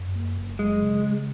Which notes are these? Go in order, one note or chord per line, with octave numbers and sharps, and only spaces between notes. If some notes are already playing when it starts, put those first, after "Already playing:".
Already playing: F#2
A#3
F#1
F#3 G#3
C#3
C#4